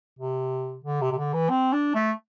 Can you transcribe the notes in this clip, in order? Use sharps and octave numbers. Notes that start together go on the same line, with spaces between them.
C3
D3
C3
C3
D3
E3
C4
D4
A3